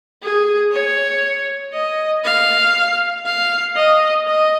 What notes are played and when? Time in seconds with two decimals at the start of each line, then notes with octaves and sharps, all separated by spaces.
0.23 G#4
0.72 C#5
1.74 D#5
2.24 F5
3.25 F5
3.76 D#5
4.27 D#5